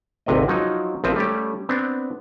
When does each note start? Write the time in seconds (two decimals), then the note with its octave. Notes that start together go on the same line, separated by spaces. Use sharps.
0.26 G#1 D2 C3 B4 D#5
0.48 F3 F#3 D#4
1.04 A#1 F3 C4 B4 E5
1.16 G3 A3 C#4 G4
1.69 B3 C4 D4